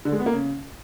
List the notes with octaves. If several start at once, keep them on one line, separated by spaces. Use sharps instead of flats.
D3
G#3
B3
A#3
C#3